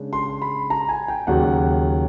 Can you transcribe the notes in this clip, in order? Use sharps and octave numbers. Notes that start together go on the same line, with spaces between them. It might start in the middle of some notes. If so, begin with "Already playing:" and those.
Already playing: C#3 G#3 D4
C6
B5
A#5
G#5
G5
D#2 C#3 F#3 F#5